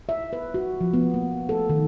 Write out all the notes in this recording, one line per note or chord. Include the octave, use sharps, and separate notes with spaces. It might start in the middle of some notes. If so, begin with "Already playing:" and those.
E5
B4
F#4
F3
B3
A#3
A4
D#3